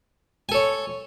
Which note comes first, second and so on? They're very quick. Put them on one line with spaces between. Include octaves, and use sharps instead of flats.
G#5 A4 C#5